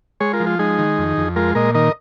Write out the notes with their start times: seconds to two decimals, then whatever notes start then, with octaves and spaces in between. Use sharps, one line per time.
0.20 G#3 G#4 C#5
0.33 F4 A#4
0.40 F3
0.47 F4
0.59 G#3 D#4 G#4
0.79 D#3
0.98 F2
1.17 F2
1.36 G#3 F4 A#4
1.55 A#2 A#4 D#5
1.75 D#3 A#4 D#5